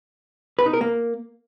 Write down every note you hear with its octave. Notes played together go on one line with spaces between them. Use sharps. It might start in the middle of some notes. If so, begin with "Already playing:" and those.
B4
D#4
A#4
A#3